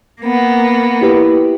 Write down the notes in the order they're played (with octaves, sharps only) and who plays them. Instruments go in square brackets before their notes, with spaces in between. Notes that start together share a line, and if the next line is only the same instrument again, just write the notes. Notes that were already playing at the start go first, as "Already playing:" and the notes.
[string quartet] A#3 B3
[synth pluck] E4 G4 B4